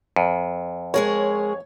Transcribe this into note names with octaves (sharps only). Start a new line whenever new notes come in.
F2
G#3 G#4 A#4 C#5